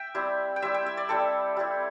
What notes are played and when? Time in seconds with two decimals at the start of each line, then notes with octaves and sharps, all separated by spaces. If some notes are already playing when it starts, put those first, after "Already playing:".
Already playing: E5 G5
0.14 G3 C4 E4
0.56 G5
0.62 G3 C4 E4 E5
0.74 G5
0.86 E5
0.97 D5
1.09 G3 C4 E4 A4
1.57 G3 C4 E4